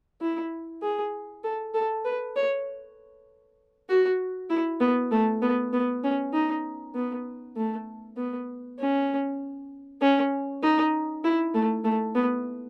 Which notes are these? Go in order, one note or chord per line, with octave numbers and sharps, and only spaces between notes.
E4
G#4
A4
A4
B4
C#5
F#4
E4
B3
A3
B3
B3
C#4
D#4
B3
A3
B3
C#4
C#4
D#4
E4
A3
A3
B3